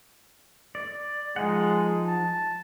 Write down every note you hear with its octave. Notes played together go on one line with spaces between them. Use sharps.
D5
F3 G#3 D#4 F#5
A5